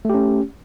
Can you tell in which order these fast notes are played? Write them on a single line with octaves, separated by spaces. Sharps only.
A3 G4 C#4